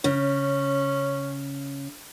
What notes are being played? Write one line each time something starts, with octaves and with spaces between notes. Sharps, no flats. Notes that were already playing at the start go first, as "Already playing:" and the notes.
C#3 C#4